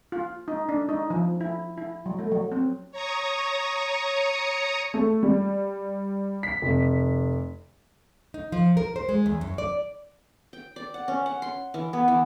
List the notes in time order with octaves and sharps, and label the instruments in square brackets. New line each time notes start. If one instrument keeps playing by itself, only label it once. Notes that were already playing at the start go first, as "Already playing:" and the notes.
[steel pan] F4
D#4
D4
D#4
F3
E4
E4
F#3
A3
F#3
C4
[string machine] C#5 A#5 C#6 D#6
[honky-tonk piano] A3
G3
B6
F1
[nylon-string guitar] D#4
F3
A#4
C5
G#3
E2
F#2
D5
[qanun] G5
D5
F#5
C#4
F#5
C6
E3
B3
E3